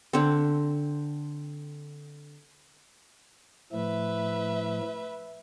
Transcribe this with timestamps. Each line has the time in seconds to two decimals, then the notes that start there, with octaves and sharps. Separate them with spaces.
0.13 D3 C4
3.72 A2 F3 A3 B4 E5